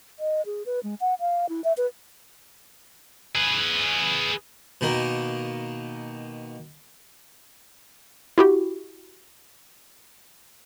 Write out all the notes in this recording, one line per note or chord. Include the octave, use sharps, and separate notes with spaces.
D#5
G#4
B4
G#3
F#5
F5
E4
E5
B4
G#4 B4
B2 D#3 A#3
E4 F#4 G4